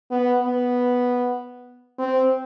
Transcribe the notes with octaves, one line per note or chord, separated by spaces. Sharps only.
B3
B3
C4